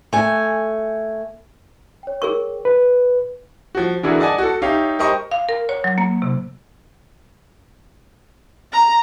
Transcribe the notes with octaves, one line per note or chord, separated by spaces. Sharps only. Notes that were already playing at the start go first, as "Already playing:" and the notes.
A3 G#5
C#5 G5
G#4 A#4 C#6
B4
F3 F#4
D3 E3 D4 F#4 G#4 A#4
D5 D#5 F#5 G#5 A5
F#4 A4
D#4 G4 C#5 E5 F5
G4 A#4 C5 D#5 C6 C#6
F5
A#4
C#5
F#3
A#3
C3
A#5